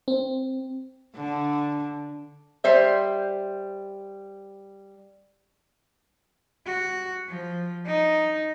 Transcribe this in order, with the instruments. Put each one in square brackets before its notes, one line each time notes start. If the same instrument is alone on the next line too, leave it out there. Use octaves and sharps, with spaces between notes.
[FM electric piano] C4
[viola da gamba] D3
[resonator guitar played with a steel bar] G3 C5 E5
[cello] F#4
F3
D#4